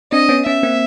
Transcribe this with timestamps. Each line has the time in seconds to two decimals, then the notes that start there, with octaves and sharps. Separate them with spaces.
0.12 C4 D4 D#5
0.29 B3 C#4
0.46 B3 C#4 E5
0.63 A#3 C4